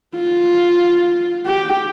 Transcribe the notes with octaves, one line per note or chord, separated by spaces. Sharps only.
F4
G4